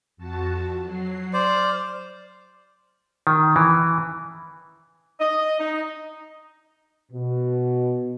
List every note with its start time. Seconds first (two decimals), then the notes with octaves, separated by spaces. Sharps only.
0.17 F2 F#4 A5
0.82 F#3 C7
1.33 C5 D5 F6
3.27 D#3
3.56 E3
5.20 D#5
5.60 D#4
7.12 B2